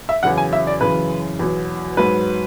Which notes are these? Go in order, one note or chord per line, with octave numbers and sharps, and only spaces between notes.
E5
E2 C#3 F#3 F#5
G#5
E5
D5
F#2 C#3 E3 B4
E2 B2 F#3
G#2 F#3 B4